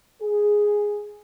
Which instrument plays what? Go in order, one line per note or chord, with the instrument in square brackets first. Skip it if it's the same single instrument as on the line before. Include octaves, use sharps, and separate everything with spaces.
[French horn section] G#4